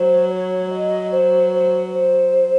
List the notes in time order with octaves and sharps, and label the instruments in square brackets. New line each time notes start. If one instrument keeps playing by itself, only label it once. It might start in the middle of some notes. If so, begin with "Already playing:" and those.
Already playing: [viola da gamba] F#3 [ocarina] C5
[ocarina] C#5
D#5
C5
C5
C5